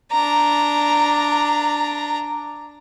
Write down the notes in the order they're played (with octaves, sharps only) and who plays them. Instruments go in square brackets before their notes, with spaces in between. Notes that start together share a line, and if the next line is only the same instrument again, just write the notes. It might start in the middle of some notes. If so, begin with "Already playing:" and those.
[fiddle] D4 A#5